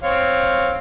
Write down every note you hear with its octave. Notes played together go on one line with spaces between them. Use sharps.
C4 C#5 F5